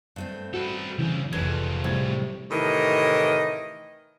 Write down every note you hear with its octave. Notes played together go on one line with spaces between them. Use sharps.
G2 A3 C4
F#4 A4 B4
C#2 E3
F1 F3 G#3 A4 B4 G#6
A2 C3 G3 G#6
A2 C3 D#3 E3 D#5